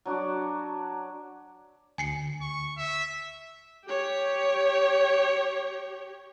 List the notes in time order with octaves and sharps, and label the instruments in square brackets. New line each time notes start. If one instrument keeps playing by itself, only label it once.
[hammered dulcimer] F#3 D4 F#4 D5
[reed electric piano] D2 [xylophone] G#5 C7 C#7
[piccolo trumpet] C#6
E5
[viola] G4 C#5